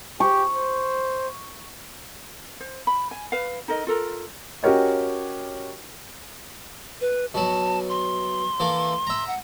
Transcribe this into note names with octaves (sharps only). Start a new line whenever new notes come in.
G4 C#6
C5
C5
B5
G#5
B4 F5
D#4 A4 A#4 D#5
F4 A4 A#4
C#4 F#4 G4 A#4 C#5 D#5
B4
B2 F#3 A5
C6
E3 A#3 A4
E5 A#5
F#5